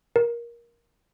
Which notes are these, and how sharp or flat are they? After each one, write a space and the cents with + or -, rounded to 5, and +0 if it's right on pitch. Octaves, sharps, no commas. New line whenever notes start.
A#4 +15